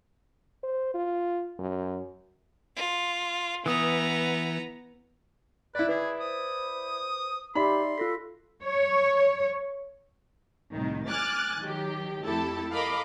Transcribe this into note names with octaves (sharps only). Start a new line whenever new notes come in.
C5
F4
F#2
F4
E3 B3 A#5 D#6
E4 B4 D5
G#4 B4
C5 D#6
D#4 G4 D5 E5 B5 C6
F4 A4 A#6 B6
C#5
C2 A2 D#3
G#5 D6 F6 F#6 A6
D#3 F#3 G4
F2 A3 E4 G4 A4 A5
A4 A#4 D#5 F5 B5 D6